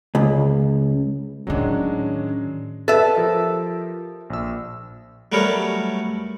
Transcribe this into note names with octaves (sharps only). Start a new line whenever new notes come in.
C#2
A2 D#3 F#3 G#3 C#4 D4
A4 B4 E5
F3 G4 A#4
A#1 E6
F#3 G3 A3 B3 A#4 C#5